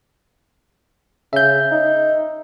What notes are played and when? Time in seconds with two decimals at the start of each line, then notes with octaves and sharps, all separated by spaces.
1.33 C#3 E5 G6
1.72 D#4